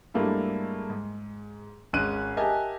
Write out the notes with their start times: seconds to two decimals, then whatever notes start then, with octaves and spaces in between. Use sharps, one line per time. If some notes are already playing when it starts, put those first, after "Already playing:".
0.14 G#2 G3 A3 A#3 D4 E4
0.90 G#2
1.93 G#1 G#3 C#4 F#6 D#7
2.37 G4 A#4 D#5 E5 G#5 A5